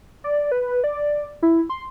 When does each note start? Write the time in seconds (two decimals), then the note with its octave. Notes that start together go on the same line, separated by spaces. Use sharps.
0.24 D5
0.52 B4
0.84 D5
1.42 E4
1.70 C6